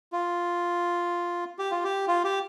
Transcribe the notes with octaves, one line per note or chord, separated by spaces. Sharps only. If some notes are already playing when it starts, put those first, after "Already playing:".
F4
G4
F4
G4
F4
G4